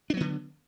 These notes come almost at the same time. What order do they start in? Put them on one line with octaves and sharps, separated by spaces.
D4 F#3 B3 D3